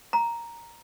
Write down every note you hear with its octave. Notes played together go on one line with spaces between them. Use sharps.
A#5